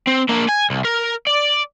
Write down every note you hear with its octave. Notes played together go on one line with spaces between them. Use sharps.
C4
A#3 D4
G#5
C2
A#4
D5